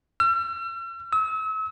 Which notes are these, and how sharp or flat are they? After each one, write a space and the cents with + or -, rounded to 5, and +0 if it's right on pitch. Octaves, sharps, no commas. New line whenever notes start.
E6 +45
E6 -40